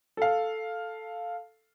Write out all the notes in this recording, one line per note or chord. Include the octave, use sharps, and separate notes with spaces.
A4 F5